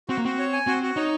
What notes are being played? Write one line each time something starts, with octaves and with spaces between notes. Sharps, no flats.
C4 F#4
A#3
C4 F#4
C#5
G#5
C4 F#4
F#4
D#4 C#5